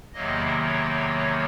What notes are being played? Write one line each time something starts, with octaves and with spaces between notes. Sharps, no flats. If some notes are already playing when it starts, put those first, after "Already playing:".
E2 C3 D#3 F#3 A#3 D#5
C#5